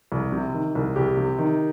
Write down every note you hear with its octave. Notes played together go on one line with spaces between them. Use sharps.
C2
C3
D#3
C2
C2 G4
C3
D#3